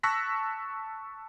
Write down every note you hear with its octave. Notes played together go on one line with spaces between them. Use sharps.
A5 C#6 E6 F#6 A#6 B6